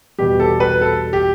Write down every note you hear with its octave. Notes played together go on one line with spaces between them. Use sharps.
E2 B2 G3 G4
A4
B4
A4
G4